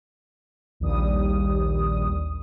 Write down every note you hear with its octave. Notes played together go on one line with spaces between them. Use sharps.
A#1 D#2 G3 D#6